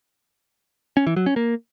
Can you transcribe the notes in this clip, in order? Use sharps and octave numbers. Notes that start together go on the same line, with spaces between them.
C#4
E3
F#3
C#4
A#3